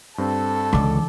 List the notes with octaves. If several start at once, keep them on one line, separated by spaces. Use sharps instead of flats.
G2 C4 A4
C#2 D3 E3 D6